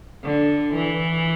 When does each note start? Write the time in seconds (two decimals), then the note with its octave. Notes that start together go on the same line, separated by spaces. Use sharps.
0.24 D3
0.74 E3